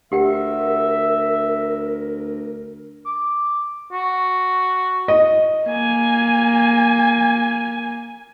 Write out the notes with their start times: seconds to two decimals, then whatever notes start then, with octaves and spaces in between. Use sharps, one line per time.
0.12 D2 G4 A#4 E5 F#5 G5
3.06 D6
3.92 F#4
5.08 D#5
5.66 A#3 G#5